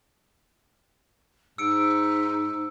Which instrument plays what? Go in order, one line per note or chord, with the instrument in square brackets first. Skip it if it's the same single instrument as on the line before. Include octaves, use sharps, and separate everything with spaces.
[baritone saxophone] G#2 [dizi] D#4 [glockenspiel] E6 C#7 D7